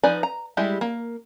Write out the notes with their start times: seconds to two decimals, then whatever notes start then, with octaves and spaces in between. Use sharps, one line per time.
0.03 F3 D#4 B4 D5 G#5
0.23 A#5
0.57 G3 G#3 E4 G4
0.81 A#3